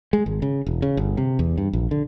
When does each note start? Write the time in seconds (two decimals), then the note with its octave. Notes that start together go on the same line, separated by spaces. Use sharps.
0.13 G#3
0.26 G#1
0.42 C#3
0.66 E1
0.82 C#3
0.97 G1
1.17 C3
1.39 E2
1.58 G2
1.73 A#1
1.91 D3